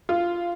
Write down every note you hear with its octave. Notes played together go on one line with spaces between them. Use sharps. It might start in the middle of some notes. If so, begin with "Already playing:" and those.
F4